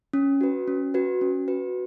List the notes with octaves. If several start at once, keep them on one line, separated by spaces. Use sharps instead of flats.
C#4
F#4 B4
C#4
F#4 B4
C#4
F#4 B4